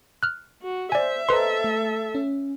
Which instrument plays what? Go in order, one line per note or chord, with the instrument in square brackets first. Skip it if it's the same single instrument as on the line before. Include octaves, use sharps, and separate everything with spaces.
[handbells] F6 F#6
[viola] F#4
[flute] C5 [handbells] D5 G#5 [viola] E5
[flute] A4 [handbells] B4 C6 [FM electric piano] C5 D#5 A#5
[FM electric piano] A3
C#4